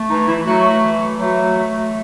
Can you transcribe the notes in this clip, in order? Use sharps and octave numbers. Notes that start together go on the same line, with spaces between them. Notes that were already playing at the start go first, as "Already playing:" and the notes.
Already playing: A3
E3 D#4
E3 E4
F#3 A3 F#4
E3
F#3 A3 F#4
A3